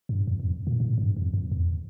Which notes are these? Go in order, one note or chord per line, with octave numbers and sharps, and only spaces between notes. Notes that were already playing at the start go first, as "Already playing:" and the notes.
G2
F2
F2
A#2
A2
G2
F2
F2
E2